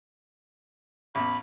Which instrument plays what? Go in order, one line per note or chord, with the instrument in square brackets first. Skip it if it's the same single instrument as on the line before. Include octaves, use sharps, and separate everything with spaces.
[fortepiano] A1 E2 [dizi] B5